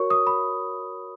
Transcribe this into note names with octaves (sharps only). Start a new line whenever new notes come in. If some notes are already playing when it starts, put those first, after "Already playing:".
Already playing: F#4 A#4 C#5 C#6
D#6
B5